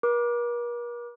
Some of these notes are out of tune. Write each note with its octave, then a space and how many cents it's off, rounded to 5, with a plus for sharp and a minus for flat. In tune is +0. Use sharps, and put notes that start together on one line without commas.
A#4 +45 D6 +0